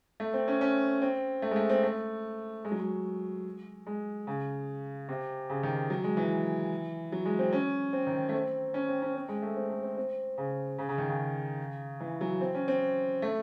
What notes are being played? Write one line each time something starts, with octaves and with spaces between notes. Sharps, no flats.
A3
C4
C#4
C#4
C4
A3
G#3
A3
C4
A3
G#3
F#3
G#3
G#3
C#3
C3
C#3
D#3
F#3
G#3
E3
F#3
G#3
C4
C#4
C4
D#3
A3
C4
C#4
C4
C#4
C4
G#3
A3
C4
A3
C4
C4
C#3
C#3
C#3
D#3
C#3
E3
F#3
C4
C#4
C4
A3